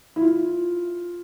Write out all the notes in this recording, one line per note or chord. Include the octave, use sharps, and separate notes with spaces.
E4
F4